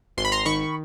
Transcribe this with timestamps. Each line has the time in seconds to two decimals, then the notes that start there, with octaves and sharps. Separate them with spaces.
0.17 G#1 C6
0.25 B5
0.32 A#5 C6
0.45 D#3 B5 C#6